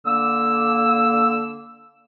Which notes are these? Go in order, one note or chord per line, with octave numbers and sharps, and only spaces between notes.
D3 A#3 E6